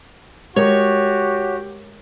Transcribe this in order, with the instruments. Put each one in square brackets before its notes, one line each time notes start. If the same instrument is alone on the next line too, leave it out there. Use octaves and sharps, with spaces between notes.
[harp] G#3 A#4 D#6 [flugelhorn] F#4 [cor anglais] G4 [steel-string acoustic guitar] C#5